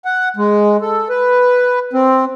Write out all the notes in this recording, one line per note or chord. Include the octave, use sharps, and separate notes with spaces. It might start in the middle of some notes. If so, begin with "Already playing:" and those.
F#5
G#3
A4
B4
C4